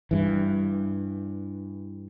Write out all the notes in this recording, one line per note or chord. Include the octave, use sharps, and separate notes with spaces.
G2 E3